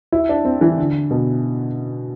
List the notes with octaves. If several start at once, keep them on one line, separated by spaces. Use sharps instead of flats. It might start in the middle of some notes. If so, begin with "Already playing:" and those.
E4
D4
C4
E3
D3
B2